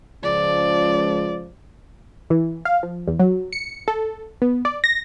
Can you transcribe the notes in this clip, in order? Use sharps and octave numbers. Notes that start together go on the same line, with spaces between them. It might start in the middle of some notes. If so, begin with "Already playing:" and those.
C#2 F3 D5
E3
F5
F3
E2
F#3
C#7
A4
B3
D5
A#6